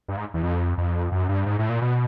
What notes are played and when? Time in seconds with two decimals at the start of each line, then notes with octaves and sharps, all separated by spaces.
0.08 G2
0.17 G#2
0.34 E2
0.43 F2
0.78 F2
1.12 F#2
1.29 G2
1.46 G#2
1.59 A2
1.69 A#2
1.81 B2